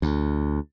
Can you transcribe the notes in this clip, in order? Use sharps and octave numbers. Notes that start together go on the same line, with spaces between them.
D2